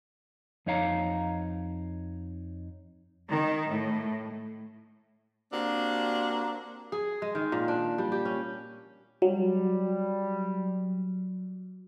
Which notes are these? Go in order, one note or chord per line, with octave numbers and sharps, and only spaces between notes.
F2 D#4 C#5 F5 A#5
D#3
A2
A#3 C4 D4 F#4 G4
G#4
G#3
D#3
A#2
D4
G3
G4
C#4
F#3 G3